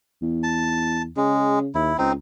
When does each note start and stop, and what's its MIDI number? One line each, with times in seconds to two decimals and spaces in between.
0.22 1.11 40
0.43 1.02 81
1.17 1.69 49
1.17 1.59 56
1.75 1.93 39
1.75 1.97 64
1.98 2.15 37
1.98 2.12 60
1.98 2.12 63